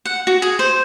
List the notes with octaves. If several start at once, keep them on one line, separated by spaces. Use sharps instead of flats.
F#5
F#4
G#4
C5